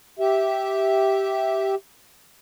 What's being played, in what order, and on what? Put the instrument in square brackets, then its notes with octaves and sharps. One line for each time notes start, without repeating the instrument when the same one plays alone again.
[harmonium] G4 E5